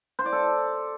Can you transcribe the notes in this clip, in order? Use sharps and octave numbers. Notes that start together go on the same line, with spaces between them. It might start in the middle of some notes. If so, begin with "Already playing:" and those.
C5
D5
A4